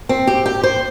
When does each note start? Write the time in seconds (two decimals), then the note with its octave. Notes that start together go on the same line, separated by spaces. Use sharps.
0.09 C4
0.27 G4
0.46 G4
0.63 C5